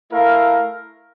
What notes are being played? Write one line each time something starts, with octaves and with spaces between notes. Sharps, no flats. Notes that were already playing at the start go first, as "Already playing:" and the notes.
A3 E4 A#4 F5